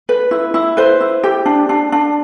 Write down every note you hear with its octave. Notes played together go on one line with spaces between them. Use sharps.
B4
E4
E4
B4 C5
E4
G4
D4
D4
D4